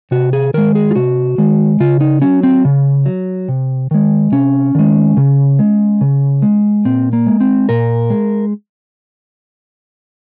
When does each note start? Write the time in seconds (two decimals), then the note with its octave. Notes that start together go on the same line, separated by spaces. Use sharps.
0.11 C3 F#4
0.33 G#4
0.54 D#3 G#3 A#4
0.75 G#4
0.91 F4
0.96 C3 F#4
1.38 D#3 G#3
1.80 C#3 F4
2.01 D#4
2.22 F#3 C#4
2.43 C4
2.65 C#3
3.06 F#3
3.48 C3
3.91 D#3 G#3
4.32 C3 C#4
4.75 D#3 G#3
5.17 C#3
5.59 G#3
6.01 C#3
6.42 G#3
6.85 A#2 C4
7.13 A#3
7.27 G#3
7.40 C4
7.69 A#2 A#4
8.10 G#3